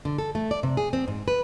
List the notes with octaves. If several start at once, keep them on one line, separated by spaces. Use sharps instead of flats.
D3
A4
A3
D5
C3
G#4
C4
G#2
B4